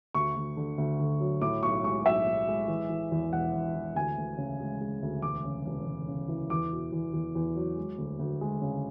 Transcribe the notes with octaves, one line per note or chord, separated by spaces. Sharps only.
D2 C#6
D2
D3
D2
D3
F#3
A2 D6
B1 C#6
G#3 C#6
B1 E5
B1
G#3
E3
E3
E2
E1 F#5
E1
E3
D2 G#5
D2
C#3
G#3
G#3
D2
E1 D6
C#3
E1
E1
C#3
E3
E2 D6
B2
E2
E2
E2
F#3
G#3
D2
D2
G#3
C#3